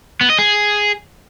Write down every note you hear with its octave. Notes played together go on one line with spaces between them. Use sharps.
B3
D#5
G#4